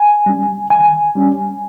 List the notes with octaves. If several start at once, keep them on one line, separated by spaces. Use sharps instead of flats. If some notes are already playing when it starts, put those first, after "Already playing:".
Already playing: G#5
G3 C#4
D#3 G#5
G3 C#4